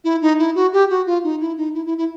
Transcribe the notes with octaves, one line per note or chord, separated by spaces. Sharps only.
E4
D#4
E4
F#4
G4
F#4
F4
D#4
E4
D#4
E4
E4
E4